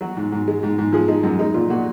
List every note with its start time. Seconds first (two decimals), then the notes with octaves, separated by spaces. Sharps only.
0.01 F#3 F#4
0.17 G#2
0.32 G#2
0.48 G#3
0.63 G#2
0.78 G#2
0.93 F3 G#4
1.08 G#3 D#4
1.23 F#2
1.39 G#3 D#4
1.54 A#2 F4
1.70 A#2 F#4